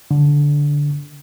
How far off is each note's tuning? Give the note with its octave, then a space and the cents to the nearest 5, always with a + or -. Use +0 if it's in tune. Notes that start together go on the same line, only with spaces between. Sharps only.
D3 -10